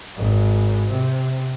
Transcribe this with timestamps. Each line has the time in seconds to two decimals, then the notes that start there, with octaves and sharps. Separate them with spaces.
0.17 G#1
0.90 C3